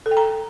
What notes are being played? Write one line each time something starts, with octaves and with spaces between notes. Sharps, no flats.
A4
G5
A#5